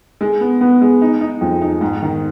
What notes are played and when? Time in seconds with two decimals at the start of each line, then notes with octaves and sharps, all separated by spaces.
0.21 G#3
0.41 B3
0.61 B3
0.81 G#3
1.02 D#4
1.21 D#4
1.41 F2
1.62 D#4
1.81 G#2
2.02 D#3